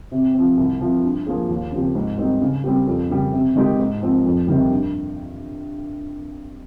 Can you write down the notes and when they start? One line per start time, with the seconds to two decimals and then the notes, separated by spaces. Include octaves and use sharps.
0.12 C3
0.34 F3 C4
0.57 C2
0.80 C3 F3
1.03 G2
1.26 F3 A#3 F4 G#4
1.49 D#2
1.72 C#3 F3 C4 G4
1.95 G#2
2.18 G3 C4 D#4
2.41 C#3
2.64 G3 C4 G4
2.87 F2
3.10 C#3 G3
3.32 C3
3.56 D#3 G#3 D#4 G4
3.79 G#2
4.02 F3 C4
4.25 F2
4.47 C3 D#3 G3
4.70 G2